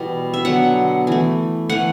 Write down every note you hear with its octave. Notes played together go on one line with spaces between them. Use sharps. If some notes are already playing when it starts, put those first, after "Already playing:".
Already playing: B2 E3 G3 B3
E5
D3 F#3 B3 F#5
E3 A3
E3 A3 F#5